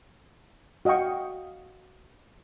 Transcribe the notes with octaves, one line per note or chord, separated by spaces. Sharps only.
F#4 D#5 F5 G5 C#6